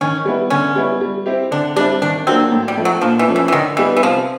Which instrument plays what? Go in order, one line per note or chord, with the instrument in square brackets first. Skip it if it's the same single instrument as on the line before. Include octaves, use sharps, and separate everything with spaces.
[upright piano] D#3 [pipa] C#4
[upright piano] G3 B3 E4
[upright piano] D3 [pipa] C#4
[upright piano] G3 B3 E4
G3
C4 E4 G4
[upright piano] D3 [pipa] D4
[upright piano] G3 C4 E4 [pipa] D4
[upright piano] D#3 [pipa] D4
[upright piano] F#3 A#3 D4 F#4 [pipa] C4
[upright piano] A2
[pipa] G3
[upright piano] F3 A3
[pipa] F#3
[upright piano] A#2 [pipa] F3
[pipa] E3
[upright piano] F3 A3 C#4
[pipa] E3
E3
[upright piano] D3 [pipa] D#3
[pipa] E3 [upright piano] G3 B3 D#4
[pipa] E3
[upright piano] C3 [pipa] F3